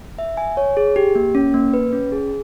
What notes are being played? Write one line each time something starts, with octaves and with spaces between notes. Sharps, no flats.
E5
G#5
C#5
G#4
G4
A#3
C#4
A#3
B4
C#4
G#4